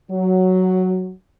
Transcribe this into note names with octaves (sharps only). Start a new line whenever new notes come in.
F#3